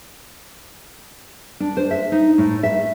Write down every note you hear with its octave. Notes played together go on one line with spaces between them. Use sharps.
D4
C5
E5
D#4
A2
E5